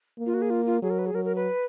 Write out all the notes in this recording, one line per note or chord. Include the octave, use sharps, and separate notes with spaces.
A#3
F4
F#4
G#4
F4
F4
F#3 G#4
A#4
B4
G#4
F#3 A#4
A#4
B4